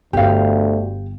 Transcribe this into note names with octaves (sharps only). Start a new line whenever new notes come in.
G1 D2 G4 F5